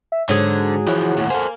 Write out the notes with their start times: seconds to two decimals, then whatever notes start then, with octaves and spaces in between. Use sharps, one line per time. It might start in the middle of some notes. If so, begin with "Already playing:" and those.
0.12 E5
0.29 G#2 D3 F#3 G#4 C5 C#5
0.88 E3 F3 E4 C#5 F#5
1.17 D#2 A2
1.30 A#3 A4 C5 G#5